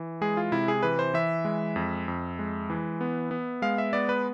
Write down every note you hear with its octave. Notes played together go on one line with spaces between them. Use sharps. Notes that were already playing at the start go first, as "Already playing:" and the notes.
Already playing: E3
G#3 G#4
F4
C3 E4
G#4
E3 B4
C5
E3 E5
G#3
F2
F2
G#3
E3
B3
B3
G#3 F5
E5
B3 D5
B4